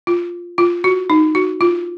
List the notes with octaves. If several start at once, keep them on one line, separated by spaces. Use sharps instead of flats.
F4
F4
F#4
D#4
F#4
F4